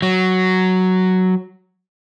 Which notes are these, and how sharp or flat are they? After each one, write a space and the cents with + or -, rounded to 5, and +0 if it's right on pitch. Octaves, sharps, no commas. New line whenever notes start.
F#3 +5